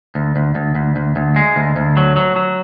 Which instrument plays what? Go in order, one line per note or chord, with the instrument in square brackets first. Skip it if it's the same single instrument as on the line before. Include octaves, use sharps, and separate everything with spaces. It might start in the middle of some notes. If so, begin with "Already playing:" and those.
[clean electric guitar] D2
D2
D2
D2
D2
D2
G#3
D2
D2
F#3
F#3
F#3